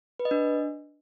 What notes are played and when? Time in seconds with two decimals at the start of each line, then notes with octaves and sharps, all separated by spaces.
0.19 B4
0.25 D#5
0.31 D4